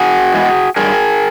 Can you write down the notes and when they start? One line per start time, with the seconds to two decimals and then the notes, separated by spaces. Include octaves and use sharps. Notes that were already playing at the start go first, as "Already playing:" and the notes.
Already playing: F#4 G#4
0.33 E3 G#3 B3
0.76 G2 G#4 A#4